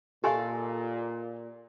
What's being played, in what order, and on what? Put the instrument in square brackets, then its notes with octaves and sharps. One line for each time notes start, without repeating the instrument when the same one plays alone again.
[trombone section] A#2 [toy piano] G4 G#5 C6 [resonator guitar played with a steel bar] A4 D#5 F5